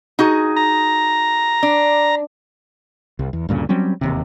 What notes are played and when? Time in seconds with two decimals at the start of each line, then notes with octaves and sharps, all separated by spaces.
0.19 D#4 F#4 G#4
0.57 A#5
1.63 D4
3.19 C2
3.33 E2
3.49 D2 G2 A#2 C#3
3.69 F#3 G3 C4 C#4
4.01 E1 D#2 C3